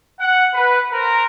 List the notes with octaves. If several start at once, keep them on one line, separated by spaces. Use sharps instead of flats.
F#5
B4
A#4 C5 A#5